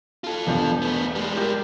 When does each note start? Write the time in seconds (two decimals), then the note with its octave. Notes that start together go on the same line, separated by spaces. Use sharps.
0.24 F4 A4
0.47 E1 G2 G6
0.82 A3 B3
1.15 G3 G#3
1.36 G4 A#4 G6